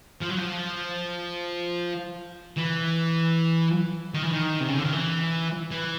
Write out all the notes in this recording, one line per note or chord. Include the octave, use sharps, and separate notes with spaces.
F3
F#3
F3
E3
D#3
E3
D#3
C3
C#3
D3
D#3
E3
E3